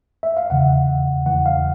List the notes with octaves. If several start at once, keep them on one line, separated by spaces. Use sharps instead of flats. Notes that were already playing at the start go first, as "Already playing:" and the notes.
E5
F5
E2 C#3 E3 F#5
E2 C#3 E3 F#5
F5